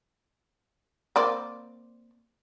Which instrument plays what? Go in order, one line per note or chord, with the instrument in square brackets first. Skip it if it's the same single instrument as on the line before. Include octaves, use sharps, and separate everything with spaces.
[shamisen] A#3 C4 D5